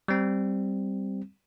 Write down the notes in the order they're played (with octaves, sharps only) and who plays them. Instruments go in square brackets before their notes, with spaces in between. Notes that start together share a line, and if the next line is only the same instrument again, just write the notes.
[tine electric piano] G3 C4